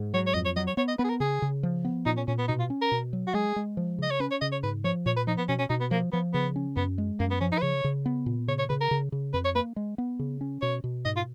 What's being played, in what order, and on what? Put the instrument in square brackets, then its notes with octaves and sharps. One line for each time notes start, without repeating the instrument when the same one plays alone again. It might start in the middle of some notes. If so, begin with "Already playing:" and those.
Already playing: [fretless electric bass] G#2
[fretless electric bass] F#3 [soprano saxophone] C#5
[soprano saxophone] C#5
[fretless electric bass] F2 [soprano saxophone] D#5
[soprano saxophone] C#5
[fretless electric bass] F#3 [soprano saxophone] D#5
[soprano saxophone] C#5
[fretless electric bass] B3 [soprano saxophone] C#5
[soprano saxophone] D#5
[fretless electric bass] B3 [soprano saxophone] B4
[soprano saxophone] G#4
A#4
[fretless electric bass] C#3 [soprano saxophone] G#4
[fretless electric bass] C#3
F3
B3
[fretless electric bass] A#2 [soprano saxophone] D#4
[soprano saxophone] C#4
[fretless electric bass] A#2 [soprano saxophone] C#4
[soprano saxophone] B3
[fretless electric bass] B2 [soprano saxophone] D#4
[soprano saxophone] F4
[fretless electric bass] C#4
[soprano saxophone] A#4
[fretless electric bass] B2
F#3
[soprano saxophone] F#4
[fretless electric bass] G#3 [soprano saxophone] G#4
[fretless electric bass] G#3
F3
[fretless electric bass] C#3 [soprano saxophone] D#5
[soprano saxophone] C#5
[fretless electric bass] C#4 [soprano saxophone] B4
[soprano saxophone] C#5
[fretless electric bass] C#3 [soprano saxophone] D#5
[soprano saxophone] C#5
[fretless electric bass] G#2 [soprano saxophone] B4
[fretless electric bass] F3 [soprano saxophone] C#5
[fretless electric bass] A#2 [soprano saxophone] C#5
[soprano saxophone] B4
[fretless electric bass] F3 [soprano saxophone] D#4
[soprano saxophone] B3
[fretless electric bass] B2 [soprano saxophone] C#4
[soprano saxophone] C#4
[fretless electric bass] B2 [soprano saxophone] D#4
[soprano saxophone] B3
[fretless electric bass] F3 [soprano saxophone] A#3
[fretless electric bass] F3 [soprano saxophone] B3
[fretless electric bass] C#3 [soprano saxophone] B3
[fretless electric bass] C#4
[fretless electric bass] F#2 [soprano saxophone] B3
[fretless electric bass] G#3
[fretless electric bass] F#2 [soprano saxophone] A#3
[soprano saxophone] B3
[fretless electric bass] F3 [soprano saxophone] C#4
[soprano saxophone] D#4
B4
[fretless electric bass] C#3 [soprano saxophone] C#5
[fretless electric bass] C#3
B3
A#2
[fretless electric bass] C#3 [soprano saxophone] C#5
[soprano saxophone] C#5
[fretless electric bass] C#3 [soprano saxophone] B4
[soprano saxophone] A#4
[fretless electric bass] C#3
C#3
[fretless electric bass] F2 [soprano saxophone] B4
[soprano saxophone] C#5
[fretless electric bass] A#3 [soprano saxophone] B4
[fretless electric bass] G#3
B3
C#3
C#4
[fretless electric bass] B2 [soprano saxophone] C#5
[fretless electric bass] B2
[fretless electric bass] G#2 [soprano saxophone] D#5
[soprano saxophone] F4